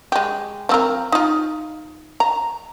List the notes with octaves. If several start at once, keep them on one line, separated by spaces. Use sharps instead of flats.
G#3 G4
F3 C4 A#4
D#4 F4
A#5